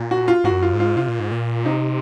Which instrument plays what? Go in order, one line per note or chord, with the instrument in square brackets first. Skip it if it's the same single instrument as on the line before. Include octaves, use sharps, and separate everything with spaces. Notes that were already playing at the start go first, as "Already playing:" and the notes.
Already playing: [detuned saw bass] A#2
[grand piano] F#4
F4
[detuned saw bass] G#2 [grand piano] F#4
[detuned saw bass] F#2
[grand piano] F4
[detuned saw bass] G#2
[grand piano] F4
[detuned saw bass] C3 [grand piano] F4
[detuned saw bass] A#2
G#2
A#2
[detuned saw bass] C3 [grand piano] D#4